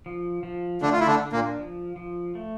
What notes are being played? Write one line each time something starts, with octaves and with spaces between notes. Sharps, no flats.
F3
F3
D3 A3 D4
F4
E4
D3 D4
D4
A#2 A#3
F3
F3
A3